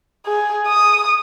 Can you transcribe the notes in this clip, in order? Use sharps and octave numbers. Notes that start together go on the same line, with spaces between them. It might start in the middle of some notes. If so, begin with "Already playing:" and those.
G#4
D#6